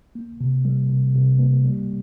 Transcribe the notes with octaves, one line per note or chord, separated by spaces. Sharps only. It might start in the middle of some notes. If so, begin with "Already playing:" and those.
A#3
C3
G3
C3
C3
A#3
G3